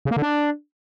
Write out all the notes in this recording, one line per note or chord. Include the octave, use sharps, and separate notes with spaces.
C#3
A#3
D3
D4